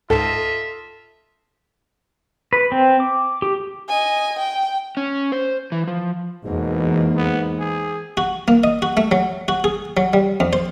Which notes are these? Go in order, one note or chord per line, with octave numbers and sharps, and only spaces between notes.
C#2 G#2 F4 A4 D#5 E5
B4
C4
D6
G4
D#5 G#5
G5
C#4
C5
E3
F3
E2 G#2 B2 A#3
B3
G#4
F#4
A#3
D#5
F#4
A3
F#3
F#4
G#4
F#3
G3
F2
C5